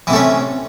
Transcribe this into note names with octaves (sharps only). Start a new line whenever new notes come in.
C3 E3 A3 C#4